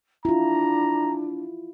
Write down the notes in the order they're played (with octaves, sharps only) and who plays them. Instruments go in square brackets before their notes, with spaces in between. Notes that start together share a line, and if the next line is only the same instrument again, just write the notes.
[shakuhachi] D4 [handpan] E4 F4 [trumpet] A#5